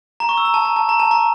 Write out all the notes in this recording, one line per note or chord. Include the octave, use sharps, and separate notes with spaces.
A#5
C#6
E6
A#5
A5
A#5
A5
A#5
A5
A#5